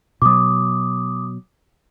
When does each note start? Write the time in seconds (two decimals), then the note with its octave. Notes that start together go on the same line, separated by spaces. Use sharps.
0.22 B2 F#3 D6 D#6